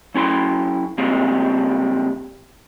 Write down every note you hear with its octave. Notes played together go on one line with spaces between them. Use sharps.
F#3 C#4 E4 C6
C#3 G3 G#3 A#3 C4